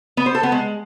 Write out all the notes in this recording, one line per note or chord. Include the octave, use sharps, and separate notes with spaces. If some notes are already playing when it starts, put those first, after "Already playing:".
B3
C5
A4
B3
G#3